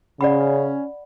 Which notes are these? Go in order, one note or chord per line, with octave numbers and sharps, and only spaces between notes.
C#3 C#4 D5 F#5 B5